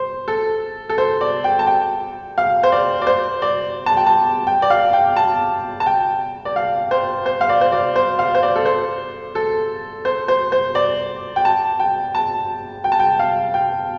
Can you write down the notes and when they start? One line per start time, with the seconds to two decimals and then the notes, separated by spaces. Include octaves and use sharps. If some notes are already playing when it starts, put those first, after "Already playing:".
Already playing: C5
0.28 A4
0.89 A4
0.98 C5
1.21 D5
1.44 G5
1.59 A5
1.67 G5
2.38 F5
2.63 C5
2.72 D5
3.02 D5
3.07 C5
3.42 D5
3.86 A5
3.97 G5
4.06 A5
4.47 G5
4.62 D5
4.70 F5
4.93 G5
5.17 A5
5.80 A5
5.86 G5
6.45 D5
6.56 F5
6.91 C5
7.26 C5
7.41 F5
7.49 D5
7.61 C5
7.72 D5
7.96 C5
8.19 F5
8.35 C5
8.43 D5
8.56 A4
8.66 C5
9.35 A4
10.05 C5
10.28 C5
10.52 C5
10.75 D5
11.36 G5
11.45 A5
11.80 G5
12.15 A5
12.84 G5
12.92 A5
13.00 G5
13.19 F5
13.54 G5